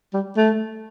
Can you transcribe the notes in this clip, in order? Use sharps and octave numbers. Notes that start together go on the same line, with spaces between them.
G3
A3